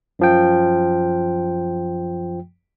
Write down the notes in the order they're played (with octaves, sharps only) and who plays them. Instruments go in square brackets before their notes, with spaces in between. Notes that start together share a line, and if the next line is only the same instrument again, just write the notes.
[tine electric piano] F#2 F3 G5